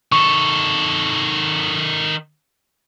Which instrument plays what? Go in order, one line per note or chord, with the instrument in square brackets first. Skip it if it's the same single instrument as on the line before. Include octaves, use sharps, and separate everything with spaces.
[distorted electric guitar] D#3 A4 [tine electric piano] C#6